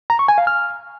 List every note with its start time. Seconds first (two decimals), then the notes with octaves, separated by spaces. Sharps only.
0.10 A#5
0.19 C#6
0.28 G#5
0.38 F5
0.47 F6